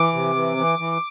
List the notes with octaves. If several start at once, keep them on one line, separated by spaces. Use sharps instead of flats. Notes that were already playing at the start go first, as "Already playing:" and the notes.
Already playing: E3 D6
C3
E3
E3
E3